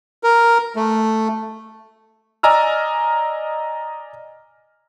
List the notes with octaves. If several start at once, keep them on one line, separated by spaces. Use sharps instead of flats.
A#4
A3
D5 D#5 G#5 A#5 E6 F6